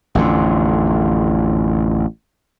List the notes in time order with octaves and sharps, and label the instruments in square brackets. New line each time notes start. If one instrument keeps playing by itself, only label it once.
[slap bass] A1 F2 D3